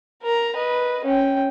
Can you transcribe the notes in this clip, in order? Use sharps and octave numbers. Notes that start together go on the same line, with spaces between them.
A#4 A#5
B4 D#5
C#4 G5